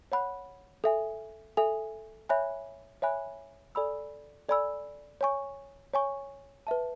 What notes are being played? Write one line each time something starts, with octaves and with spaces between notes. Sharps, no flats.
C#5 F#5 B5 F#6
A4 E5 G#5
A4 E5 G#5
C#5 E5 G#5 B5 F#6
C#5 E5 G#5 B5 F#6
A4 D5 G#5 B5 E6
A4 D5 G#5 B5 E6
C#5 G#5 C#6
C#5 G#5 C#6
B4 E5 A5